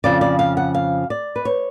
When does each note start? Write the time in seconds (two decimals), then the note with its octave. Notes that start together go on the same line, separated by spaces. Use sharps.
0.04 F2 C#3 F3 D5
0.21 D5
0.39 F5
0.57 F#5
0.74 F5
1.10 D5
1.36 B4
1.45 C#5